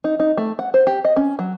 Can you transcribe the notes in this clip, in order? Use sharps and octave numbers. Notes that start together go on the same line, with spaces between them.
D#4
D#4
A3
F#5
C5
G4
D#5
C#4
F#3